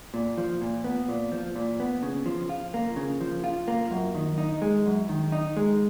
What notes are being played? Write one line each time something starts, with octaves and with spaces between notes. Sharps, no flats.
A#2
F3
A#2
B3
A#2
F3
A#2
B3
C#3
F3
F4
A#3
C#3
F3
F4
A#3
F#2
D#3
D#4
G#3
F#2
D#3
D#4
G#3